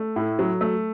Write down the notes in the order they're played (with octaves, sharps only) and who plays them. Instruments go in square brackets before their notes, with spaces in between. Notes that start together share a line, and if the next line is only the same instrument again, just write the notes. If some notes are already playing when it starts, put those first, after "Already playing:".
Already playing: [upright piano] A3
A2
F#3
A3